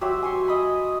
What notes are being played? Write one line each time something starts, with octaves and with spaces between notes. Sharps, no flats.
F#3 G4 C5 E5
G#5 C6 C#6
D#5 B5